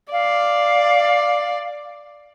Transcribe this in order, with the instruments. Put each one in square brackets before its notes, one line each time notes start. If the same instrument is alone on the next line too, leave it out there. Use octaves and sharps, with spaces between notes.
[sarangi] D5 [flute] F5